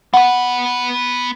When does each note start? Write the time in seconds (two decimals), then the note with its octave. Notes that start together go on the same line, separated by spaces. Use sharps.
0.14 B3 B4 F#5